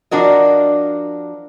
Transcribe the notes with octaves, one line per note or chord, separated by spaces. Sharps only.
F3 D4 F#4 A#4 D#5